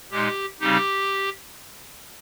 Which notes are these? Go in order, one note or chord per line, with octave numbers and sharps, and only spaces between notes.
A#2 G#3 D#4 G4
C#3 G3 C4 D#4 G4